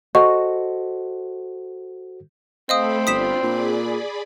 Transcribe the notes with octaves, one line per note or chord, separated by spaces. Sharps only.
F#4 A4 C5 D#5 C#6
A3 C4 A4 D#5 F5 B5 D#6
G1 D4 F4 B5 D#6 B6 E7
A#2 G#4 D5 B5